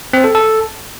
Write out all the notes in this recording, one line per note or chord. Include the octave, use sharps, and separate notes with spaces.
C4
A4
A4